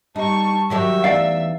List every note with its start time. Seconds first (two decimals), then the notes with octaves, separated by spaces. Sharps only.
0.16 G3 D#4 A5 C#6
0.70 D#3 F#3 G4 E5
1.04 E2 A3 D#4 D5 F5